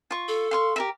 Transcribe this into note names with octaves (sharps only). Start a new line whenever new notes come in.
F4 C#6
A4
F5 C6 C#6
G4 A#4 E5